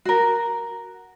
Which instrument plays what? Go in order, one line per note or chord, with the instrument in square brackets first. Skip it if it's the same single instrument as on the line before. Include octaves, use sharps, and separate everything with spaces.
[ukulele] F#4 A#4